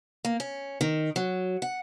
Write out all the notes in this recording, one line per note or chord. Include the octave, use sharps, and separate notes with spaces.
A#3
C#4
D#3
F#3
F#5